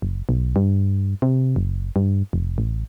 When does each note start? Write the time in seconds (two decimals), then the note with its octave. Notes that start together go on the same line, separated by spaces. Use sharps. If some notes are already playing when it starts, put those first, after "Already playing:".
0.02 F#1
0.29 B1
0.56 G2
1.22 C3
1.56 F#1
1.96 G2
2.33 F1
2.58 A1